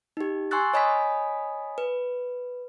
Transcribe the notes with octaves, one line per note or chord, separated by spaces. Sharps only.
D#4 G4
G#5 C6 C#6 E6 F#6 A6
C#5 D#5 G#5 B5 D#6 B6
B4